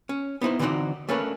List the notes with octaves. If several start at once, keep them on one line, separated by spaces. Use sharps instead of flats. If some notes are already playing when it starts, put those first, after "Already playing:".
C#4
B3 D#4 E4 C5
D3 E3 C4 D#4 F#4 D5
A3 A#3 C#4 D4 B4